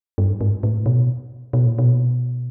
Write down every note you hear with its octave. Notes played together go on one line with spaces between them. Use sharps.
G2
G#2
A2
B2
B2
A#2
B2